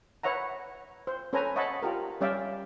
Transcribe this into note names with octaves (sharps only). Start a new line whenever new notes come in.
B4 C#5 E5 F#5 A#5
C5
C#4 A4 B4 C5 G#5 A#5
C#5 D#5 E5 F#5 A5 B5
F4 G4 A#4
G3 C#4 D5 E5 F5 G5